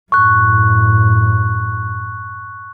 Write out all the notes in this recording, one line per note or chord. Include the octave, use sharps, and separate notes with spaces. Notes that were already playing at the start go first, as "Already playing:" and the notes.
F#2 A2 C#6 F#6